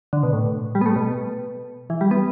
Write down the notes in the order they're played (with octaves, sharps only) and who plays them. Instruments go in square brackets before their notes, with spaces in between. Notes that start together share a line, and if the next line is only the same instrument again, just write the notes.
[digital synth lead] D3
B2
A2
G3
B3
A3
B2
E3
G3
B3